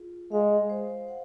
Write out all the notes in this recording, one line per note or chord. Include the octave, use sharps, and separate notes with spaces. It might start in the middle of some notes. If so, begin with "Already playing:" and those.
Already playing: F4 G#4
G#3 F5
C5
F#5